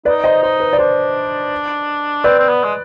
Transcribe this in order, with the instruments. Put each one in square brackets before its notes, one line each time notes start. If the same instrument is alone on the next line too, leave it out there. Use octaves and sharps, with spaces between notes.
[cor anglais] D#4 [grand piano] B4 D5
[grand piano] C5 D#5
[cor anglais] D#4 [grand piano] C5
[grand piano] B4
D5
[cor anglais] D4 [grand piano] C5
[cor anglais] C4 [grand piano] B4 D5
[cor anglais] C4
B3
G#3